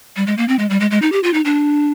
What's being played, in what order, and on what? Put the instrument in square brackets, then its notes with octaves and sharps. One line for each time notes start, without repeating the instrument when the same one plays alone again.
[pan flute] G3
G#3
A#3
C4
G#3
G3
G#3
G#3
D#4
G4
F4
D#4
D4